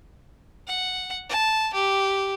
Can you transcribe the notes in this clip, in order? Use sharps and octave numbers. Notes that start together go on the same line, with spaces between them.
F#5
A5
G4